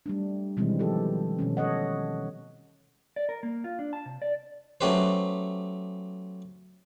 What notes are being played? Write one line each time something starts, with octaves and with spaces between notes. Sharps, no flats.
G3 A3 D4
B2 D#3 E3 G3 G#3 C4
F3 G4 A4
B2 D#3 C#4
A4 C#5 D#5 F#5
D5
A#4
A#3
F4
D4
A5
C3
D5
F#3 A3 C#4 G4 B4 C5